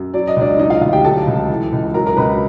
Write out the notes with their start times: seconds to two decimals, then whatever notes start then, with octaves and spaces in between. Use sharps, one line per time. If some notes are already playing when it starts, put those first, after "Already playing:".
Already playing: F#2
0.14 F#3 D5
0.28 D#5
0.36 C#2 D4 D5
0.59 F#3 D#4 D#5
0.70 F4 F5
0.81 D2 F4 F5
0.93 G4 G5
1.04 F#3 A4 A5
1.27 C#2
1.50 E3
1.72 C#2
1.94 F#3 A#4 A#5
2.06 A#4 A#5
2.17 C#2 B4 B5